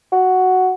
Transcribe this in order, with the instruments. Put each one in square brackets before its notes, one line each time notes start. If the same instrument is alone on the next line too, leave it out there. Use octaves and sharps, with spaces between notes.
[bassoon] F#4